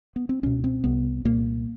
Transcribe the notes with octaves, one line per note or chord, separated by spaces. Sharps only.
B3
C4
C#2 B2 C#4
C4
C2 C3 B3
C2 A#2 A#3